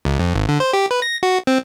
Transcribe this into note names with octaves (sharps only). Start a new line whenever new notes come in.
C#2
F2
G#1
D3
C5
G4
B4
A#6
F#4
C4